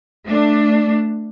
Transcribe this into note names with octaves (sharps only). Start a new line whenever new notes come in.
A3 D4